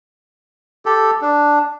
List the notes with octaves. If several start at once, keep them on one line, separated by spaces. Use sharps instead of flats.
G4 A4
D4